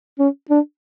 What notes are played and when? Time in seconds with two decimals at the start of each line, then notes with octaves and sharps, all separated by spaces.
0.19 C#4
0.50 D4